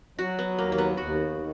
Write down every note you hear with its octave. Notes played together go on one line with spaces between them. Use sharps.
F#3 F#4
B3
D#2 A#3
A#3
B3
D#2 F#4
D#3